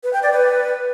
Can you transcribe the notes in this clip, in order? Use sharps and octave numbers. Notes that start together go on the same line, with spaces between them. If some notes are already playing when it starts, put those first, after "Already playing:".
B4
G5
D5
B4